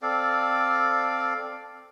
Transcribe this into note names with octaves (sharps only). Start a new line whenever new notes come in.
C4 A4 D5 F5